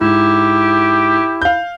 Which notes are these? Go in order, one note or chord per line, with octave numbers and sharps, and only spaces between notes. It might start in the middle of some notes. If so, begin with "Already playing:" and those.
G#2 E4 G4
F5 G6